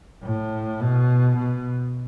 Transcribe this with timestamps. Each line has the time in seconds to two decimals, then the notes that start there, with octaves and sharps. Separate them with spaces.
0.23 A2
0.80 B2
1.36 B2